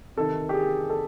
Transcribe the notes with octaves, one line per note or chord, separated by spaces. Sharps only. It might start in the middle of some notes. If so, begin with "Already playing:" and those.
C3 D#3 A4
G4
G#4
A4